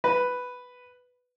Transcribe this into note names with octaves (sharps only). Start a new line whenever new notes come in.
B4